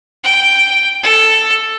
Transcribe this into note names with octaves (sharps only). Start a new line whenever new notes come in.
G5
A4